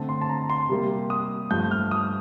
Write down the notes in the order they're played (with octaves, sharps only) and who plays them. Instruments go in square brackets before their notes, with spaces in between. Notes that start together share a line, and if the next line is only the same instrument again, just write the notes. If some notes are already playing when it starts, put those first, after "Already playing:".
Already playing: [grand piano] D3 A3 C4 A5
C6
A5
A#5
C6
C3 G3 A#3
D#6
G2 F3 A3 G6
F6
D#6